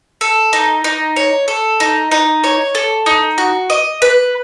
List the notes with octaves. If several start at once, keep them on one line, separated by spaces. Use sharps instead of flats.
A4
D#4
D#4
C#5
A4
D#4
D#4
C#5
A4
D#4
F#4
D#5
B4